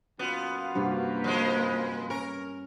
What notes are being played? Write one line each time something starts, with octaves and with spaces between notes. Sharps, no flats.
F#2 A#2 B3 F4
G2 C3 A#3 F#4 B4
F3 G#3
C#4 A#4 C#5